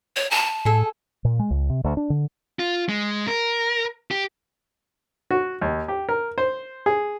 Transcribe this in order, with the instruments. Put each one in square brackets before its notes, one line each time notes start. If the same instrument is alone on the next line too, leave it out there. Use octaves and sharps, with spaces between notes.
[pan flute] C#5
A5
[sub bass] A2 [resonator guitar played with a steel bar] G#4 A4
[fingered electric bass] A#2
G#3
C#2
C3
D2
D4
D3
[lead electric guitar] F4
G#3
A#4
G4
[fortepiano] F#4
D#2
G4
A#4
C5
G#4